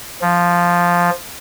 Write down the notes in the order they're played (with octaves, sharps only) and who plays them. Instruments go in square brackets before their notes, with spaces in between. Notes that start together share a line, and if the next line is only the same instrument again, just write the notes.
[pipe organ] F3